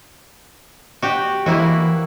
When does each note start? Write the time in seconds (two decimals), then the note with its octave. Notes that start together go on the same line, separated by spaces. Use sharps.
1.02 F#4 G4
1.46 E3 A#3 E4 F#4 B4 C5